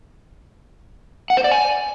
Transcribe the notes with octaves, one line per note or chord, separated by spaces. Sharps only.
F#5
C5
D5
G#5